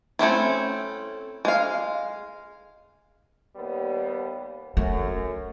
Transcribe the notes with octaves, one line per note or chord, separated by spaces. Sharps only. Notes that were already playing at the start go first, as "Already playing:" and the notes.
A3 C4 C#4 E4
G#3 F5
D#2 G3 B3
F#2 A3